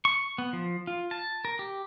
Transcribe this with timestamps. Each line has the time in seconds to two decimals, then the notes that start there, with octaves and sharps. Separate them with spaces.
0.05 C#6
0.38 B3
0.53 F3
0.87 F4
1.11 A5
1.45 A#4
1.59 G4